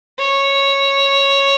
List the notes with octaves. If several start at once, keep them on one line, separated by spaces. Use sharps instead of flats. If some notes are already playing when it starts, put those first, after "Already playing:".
C#5